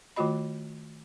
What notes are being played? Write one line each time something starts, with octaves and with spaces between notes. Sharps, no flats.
D#3 A3 F4 F#4 D#5 B5